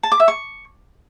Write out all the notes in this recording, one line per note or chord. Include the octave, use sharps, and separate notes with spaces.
A5
D6
E5
C#6